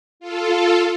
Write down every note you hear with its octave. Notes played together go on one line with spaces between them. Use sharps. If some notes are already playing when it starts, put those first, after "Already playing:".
F4 A4